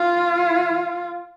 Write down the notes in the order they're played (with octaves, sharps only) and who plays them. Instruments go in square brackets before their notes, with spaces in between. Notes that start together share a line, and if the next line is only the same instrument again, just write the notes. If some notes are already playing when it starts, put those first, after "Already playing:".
Already playing: [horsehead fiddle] F4